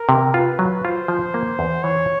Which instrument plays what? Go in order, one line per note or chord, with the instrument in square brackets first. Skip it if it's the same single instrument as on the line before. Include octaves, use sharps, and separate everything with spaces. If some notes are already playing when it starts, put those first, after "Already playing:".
Already playing: [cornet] A#4
[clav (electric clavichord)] C3
[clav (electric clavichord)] F4 [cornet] B4
[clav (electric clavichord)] F#3
[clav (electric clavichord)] F4 [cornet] C5
[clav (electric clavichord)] F3
A#3
E2
[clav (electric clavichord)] E3 [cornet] C#5